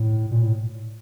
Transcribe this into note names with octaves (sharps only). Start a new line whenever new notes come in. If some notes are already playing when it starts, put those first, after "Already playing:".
Already playing: A2
A#2
A2